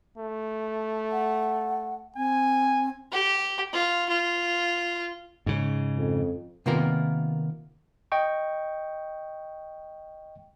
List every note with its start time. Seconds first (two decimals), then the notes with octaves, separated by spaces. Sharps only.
0.18 A3
1.12 F#5
2.16 C4 G#5
3.12 G4
3.73 F4
4.09 F4
5.46 G#2 C#3
5.98 F2
6.66 C3 D#3 A#3 B3 F4 A#4
8.12 D#5 G5 C#6